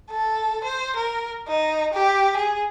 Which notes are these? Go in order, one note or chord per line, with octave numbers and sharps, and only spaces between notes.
A4
C5
A#4
D#4
G4
G#4